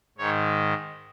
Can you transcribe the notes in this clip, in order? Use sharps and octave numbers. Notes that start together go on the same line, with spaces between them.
G#2 D#3 C#5